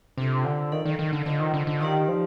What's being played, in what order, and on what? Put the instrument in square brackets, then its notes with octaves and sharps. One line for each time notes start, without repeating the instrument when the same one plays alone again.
[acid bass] C3 [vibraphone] D4 F4 A4 C5
[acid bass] D3
[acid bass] D#3 [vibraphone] D#4 A4 D5 F5
[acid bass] D#3
D#3
D3
[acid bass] D3 [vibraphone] F4 C5 D#5
[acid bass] D#3
D3
D3
[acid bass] D#3 [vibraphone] D#4 G4 D5 F5
[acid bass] F3